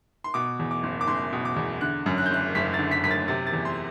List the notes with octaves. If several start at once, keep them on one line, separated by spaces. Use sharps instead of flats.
C6
B2 D6
E2
D6
F#1
D6
F#1 C6
B2
D6
E2
D3 F#6
F#2
F#6
G6
F#1 F#6
F#1 B6
A6
D3
B6
F#2 B6
A6
C3 A6
A6
E2
C6